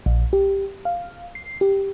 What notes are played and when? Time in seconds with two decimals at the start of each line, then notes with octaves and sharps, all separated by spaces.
0.06 A#1
0.33 G4
0.85 F5
1.35 C7
1.61 G4